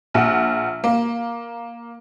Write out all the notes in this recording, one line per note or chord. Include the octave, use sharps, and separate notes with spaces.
A#1 F#5
A#3